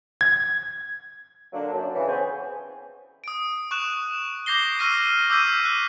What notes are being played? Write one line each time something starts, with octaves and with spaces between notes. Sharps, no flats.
G#6
D3 F#3 A#3 D4
F#2
C#3 E3
B3 C4 G#4 C5 C#5 G#5
D#6 D7
C#6 F#6 E7
D6 G6 A#6 C7 G7
C#6 E6 F6 A#6 C7 D#7
D6 E6 G6 B6 D#7
F#6